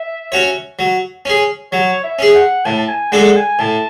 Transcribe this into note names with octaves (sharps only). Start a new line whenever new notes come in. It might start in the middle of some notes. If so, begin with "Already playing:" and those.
Already playing: E5
C#4 F#4 C#5
F#3
C#4 G#4
F#3 C#5
E5
C#4 G#4
F#5
A2 A5
A5
G#5
G#3 D4 A4 F#5
G#5
A2 A5